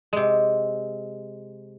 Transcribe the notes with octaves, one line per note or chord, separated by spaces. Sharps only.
C3 G#3